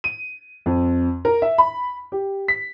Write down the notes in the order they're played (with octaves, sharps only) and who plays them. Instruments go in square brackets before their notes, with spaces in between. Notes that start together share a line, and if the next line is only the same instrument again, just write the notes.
[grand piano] D#7
F2
A#4
E5
B5
G4
B6